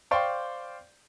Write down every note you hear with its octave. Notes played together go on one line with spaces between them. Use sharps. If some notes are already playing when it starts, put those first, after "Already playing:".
C5 D5 F5 G5 C6 C#6